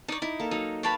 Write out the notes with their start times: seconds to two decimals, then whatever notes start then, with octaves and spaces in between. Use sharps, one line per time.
0.08 D#4 C#5 D5
0.22 D#4 E4
0.40 A#3 A4
0.51 F#3 D#4
0.83 B4 C#5 F5 G5 A5 B5